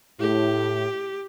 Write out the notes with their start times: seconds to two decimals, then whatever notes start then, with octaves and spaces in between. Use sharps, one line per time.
0.20 A2 G4